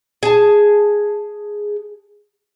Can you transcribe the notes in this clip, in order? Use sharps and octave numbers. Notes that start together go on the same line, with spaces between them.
G#4 A5